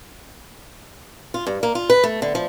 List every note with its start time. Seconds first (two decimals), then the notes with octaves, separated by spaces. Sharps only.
1.34 F4
1.47 G2
1.63 A#3
1.75 F4
1.90 B4
2.04 A3
2.22 D3
2.35 F3